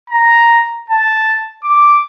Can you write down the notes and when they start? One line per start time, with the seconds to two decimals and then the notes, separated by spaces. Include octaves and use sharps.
0.10 A#5
0.90 A5
1.64 D6